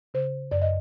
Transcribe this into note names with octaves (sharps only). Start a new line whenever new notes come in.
C#3 C5
F#2 D5
D#5